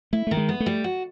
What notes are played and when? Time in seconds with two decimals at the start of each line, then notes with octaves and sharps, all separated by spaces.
0.13 A3 E4
0.27 D#3 A3
0.37 G#3
0.49 B3
0.60 A3
0.66 G3
0.84 F#4